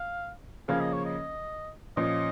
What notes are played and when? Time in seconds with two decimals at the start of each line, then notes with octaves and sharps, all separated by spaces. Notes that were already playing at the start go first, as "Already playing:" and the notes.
Already playing: F5
0.68 C#3 F3 A#3 C#4 G#4 F5
0.81 D#5
0.93 C#5
1.06 D#5
1.97 A#2 F3 C#4 D#5